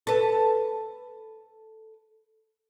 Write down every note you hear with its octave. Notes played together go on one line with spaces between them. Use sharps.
A4 B4